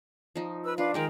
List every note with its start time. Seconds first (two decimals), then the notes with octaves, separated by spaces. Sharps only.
0.36 F3 D#4
0.64 B4 E6
0.78 D4 F4 B4 F5
0.94 D#3 G#3 D#4 A#4 G5